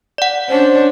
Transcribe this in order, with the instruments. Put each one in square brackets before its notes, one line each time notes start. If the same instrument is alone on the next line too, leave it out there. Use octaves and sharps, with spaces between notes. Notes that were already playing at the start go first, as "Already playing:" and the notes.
[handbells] D5 F#5
[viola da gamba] C#4 D4 [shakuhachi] C5